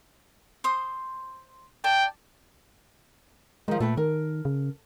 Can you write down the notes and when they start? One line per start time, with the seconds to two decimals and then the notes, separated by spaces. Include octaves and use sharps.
0.64 C5 C6 D#6
1.84 D5 G5 A5
3.68 D#3 F3 G#3
3.80 A#2 A3 B4 G5
3.97 D#3 A#4
4.45 C#3